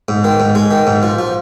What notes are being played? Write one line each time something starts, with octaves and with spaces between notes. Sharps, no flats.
G#2
D#3
G#2
G#3
D#3
G#2
F3
F3